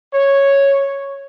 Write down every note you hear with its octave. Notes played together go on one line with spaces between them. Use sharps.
C#5